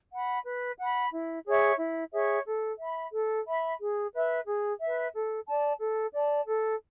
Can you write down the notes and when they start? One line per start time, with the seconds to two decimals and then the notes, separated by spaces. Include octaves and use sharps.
0.11 F#5 B5
0.45 B4
0.79 F#5 B5
1.12 E4
1.46 G#4 C#5 E5
1.78 E4
2.12 G#4 C#5 E5
2.46 A4
2.79 E5 B5
3.13 A4
3.46 E5 B5
3.80 G#4
4.13 B4 E5
4.47 G#4
4.80 E5
4.85 B4
5.14 A4
5.48 D5 A5
5.80 A4
6.14 D5 A5
6.48 A4